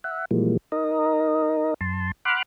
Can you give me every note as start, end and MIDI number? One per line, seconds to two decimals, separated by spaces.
0.04 0.25 76
0.04 0.25 78
0.31 0.57 46
0.31 0.57 52
0.31 0.57 53
0.31 0.57 55
0.31 0.57 56
0.31 0.57 58
0.72 1.74 63
0.72 1.74 70
0.72 1.74 75
1.81 2.11 42
1.81 2.11 81
1.81 2.11 84
2.25 2.43 78
2.25 2.43 83
2.25 2.43 84
2.25 2.43 86
2.25 2.43 89
2.25 2.43 90